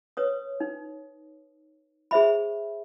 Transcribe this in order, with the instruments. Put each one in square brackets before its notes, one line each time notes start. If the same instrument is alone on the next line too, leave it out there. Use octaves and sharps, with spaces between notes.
[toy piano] B4 C#5 D#6
D#4
G#4 C5 E5 B5